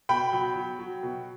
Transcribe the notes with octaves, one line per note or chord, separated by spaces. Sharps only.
B2 G5 B5
F#3
F#3
F#3
B2